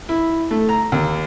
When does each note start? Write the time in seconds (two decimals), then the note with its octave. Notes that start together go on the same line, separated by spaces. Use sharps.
0.09 E4
0.51 A3
0.69 A#5
0.92 D#2